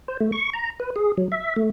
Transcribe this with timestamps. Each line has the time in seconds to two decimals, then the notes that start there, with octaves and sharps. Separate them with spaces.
0.08 C5
0.20 A3
0.32 C#6
0.53 A#5
0.80 B4
0.96 G#4
1.18 F#3
1.32 E5
1.56 A3